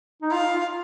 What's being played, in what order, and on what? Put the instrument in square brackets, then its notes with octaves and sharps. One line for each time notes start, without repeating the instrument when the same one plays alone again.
[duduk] D#4
[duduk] F4 [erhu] F5
[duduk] F4